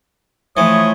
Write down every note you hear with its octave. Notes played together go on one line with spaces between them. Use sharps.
E3 F3 A3 C#5 D#6